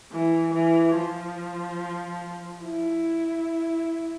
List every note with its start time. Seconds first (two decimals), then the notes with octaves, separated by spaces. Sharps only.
0.12 E3
0.54 E3
0.95 F3
2.62 E4